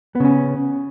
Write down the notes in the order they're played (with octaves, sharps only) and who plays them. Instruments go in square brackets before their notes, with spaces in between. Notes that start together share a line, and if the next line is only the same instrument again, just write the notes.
[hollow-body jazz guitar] B3
C#3
C#4